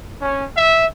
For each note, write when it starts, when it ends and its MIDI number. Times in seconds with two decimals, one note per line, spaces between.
0.21 0.46 61
0.56 0.86 76